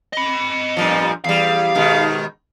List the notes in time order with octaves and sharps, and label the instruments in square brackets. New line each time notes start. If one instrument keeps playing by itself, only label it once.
[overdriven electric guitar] D#5 B5
[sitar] G2 A#2 F3
[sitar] E2 G3 [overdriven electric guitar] F5
[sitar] G#2 B2 D#3